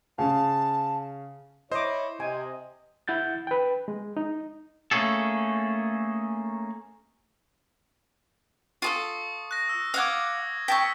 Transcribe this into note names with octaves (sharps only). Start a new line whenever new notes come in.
C#3 F5 A5
E4 C5 C#5 D#5 D6
C3 D#5 G#5
E4 F#5 G6 A6
B4 G5
G#3
D#4
A3 A#3 C#4 G#4 A4
F4 G#4 A4 C#6 D#6
F#6 A#6
E6
F5 F#5 D6 D#6 G#6
G5 A5 C#6 E6 B6